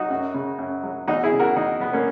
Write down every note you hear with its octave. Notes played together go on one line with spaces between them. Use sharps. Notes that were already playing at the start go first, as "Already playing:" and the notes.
Already playing: F#3 D#4 F#4
F#2
C#3
F#2
F#3
E2 D#4 F#4
E4 G#4
C#3
F#4 A#4
E2 D#4 F#4
F#3 B3
A#3 C#4